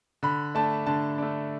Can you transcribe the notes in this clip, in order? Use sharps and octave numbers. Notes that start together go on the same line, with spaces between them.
D3 B5
A3 D4 A5
D3 A5
A3 D4